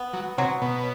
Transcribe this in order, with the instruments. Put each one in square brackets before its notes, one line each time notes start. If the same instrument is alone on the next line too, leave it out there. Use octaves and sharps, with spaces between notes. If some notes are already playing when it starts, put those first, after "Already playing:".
Already playing: [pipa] B3
[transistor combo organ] F#3
[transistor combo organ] C3 [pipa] F#3
[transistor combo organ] B2